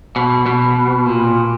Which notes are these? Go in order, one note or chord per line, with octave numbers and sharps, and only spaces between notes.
B2
B2
A#2